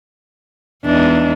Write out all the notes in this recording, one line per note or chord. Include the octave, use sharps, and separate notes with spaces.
E2 G#3 D4 D#4